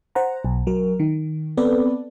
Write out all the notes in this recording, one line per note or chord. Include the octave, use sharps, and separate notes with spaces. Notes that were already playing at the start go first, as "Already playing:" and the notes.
C5 F#5 A#5
B1
F#3 A#4
D#3
B3 C4 A4 B4 D5